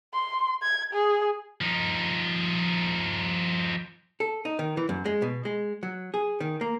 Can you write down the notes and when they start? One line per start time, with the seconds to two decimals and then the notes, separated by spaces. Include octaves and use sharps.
0.13 C6
0.62 G#6
0.93 G#4
1.61 F3 D#4
4.20 A4
4.45 D#4
4.59 D#3
4.77 E3
4.89 F#2
5.06 G#3
5.22 B2
5.45 G#3
5.83 F#3
6.14 G#4
6.40 D#3
6.61 A#3